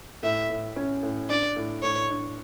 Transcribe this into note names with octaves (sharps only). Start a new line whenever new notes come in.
A2 E5
A2
C#4
A2
D4 D5
A2
A2 C#5
D4